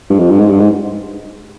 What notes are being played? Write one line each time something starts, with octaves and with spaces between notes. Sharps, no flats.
G2
F2
G2
G#2
G2
G#2